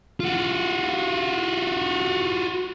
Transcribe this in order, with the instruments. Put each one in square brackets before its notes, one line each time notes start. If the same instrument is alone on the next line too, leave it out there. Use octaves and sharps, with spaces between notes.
[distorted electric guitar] F4 F#4